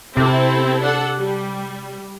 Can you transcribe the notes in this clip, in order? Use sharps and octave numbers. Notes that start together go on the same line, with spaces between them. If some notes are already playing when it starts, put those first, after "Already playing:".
C3 C4 E4 A4
D4 A4 F#5
G3